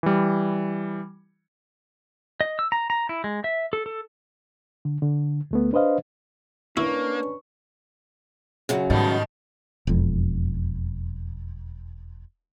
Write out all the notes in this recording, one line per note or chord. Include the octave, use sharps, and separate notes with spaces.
E3 G3
D#5
E6
A#5
A#5
E4
G#3
E5
A4
A4
D3
D3
D2 A3 B3
D4 B4 C5 D#5 F5
A#3 C#4 D4 E4 B4 C#6
F#2 C#3 F#3
G#2 B2 D#3 G3
E1 F2